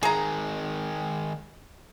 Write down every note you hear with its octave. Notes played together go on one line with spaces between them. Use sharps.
D#3 G#3 G#4 A#5